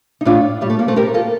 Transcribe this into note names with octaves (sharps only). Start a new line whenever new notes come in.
D#4
A2 D4 F4
A2 G3
A3
G3 A#3
A3 C4
A2 G4 A#4
F4 A4